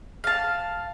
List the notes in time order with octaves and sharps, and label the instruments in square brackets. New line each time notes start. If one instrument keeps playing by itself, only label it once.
[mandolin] F5 A5